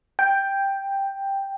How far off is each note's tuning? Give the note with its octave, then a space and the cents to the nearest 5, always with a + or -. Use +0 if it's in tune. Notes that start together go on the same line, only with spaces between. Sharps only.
G5 +5